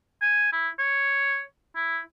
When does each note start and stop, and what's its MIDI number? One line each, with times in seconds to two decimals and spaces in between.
0.22 0.53 80
0.53 0.69 64
0.79 1.42 73
1.76 2.00 64